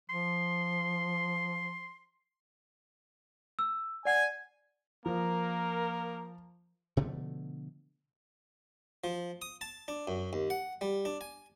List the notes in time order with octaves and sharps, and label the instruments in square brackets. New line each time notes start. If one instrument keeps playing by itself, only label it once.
[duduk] F3 [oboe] C6
[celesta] E6
[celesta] D5 F#5 [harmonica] G#5
[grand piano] F3 [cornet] A#3 [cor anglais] A#4
[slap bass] B2 D3 F3 A3
[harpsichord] F3
D#6
A5
D4
F#2
D#2
F#5
G3
D4
G#5